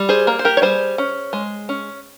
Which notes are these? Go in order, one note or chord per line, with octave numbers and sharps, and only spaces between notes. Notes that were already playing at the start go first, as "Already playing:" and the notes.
Already playing: G3
G#4 C5
A#3
C5
G4 A#4
C#5
G3 G#4 C5
C#4
G#3
C#4